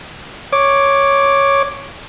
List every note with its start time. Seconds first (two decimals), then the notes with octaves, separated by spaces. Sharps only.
0.53 C#5 D6